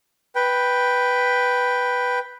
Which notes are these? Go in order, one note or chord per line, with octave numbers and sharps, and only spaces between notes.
B4 G5